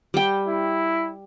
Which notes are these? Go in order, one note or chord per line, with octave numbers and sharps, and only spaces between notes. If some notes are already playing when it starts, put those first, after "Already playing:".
G3 G5
E4